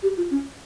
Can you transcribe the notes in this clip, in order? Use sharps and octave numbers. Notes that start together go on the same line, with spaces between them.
G4
F4
C#4